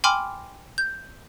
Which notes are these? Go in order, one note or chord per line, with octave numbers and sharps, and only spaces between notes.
G5 G#5 B5 C6 D6 F6
G6